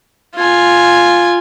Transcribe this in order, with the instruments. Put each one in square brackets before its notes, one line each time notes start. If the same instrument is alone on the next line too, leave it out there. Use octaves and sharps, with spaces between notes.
[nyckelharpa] F4 G#5